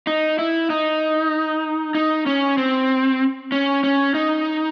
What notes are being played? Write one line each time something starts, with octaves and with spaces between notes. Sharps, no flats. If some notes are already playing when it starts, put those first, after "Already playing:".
D#4
E4
D#4
D#4
C#4
C4
C#4
C#4
D#4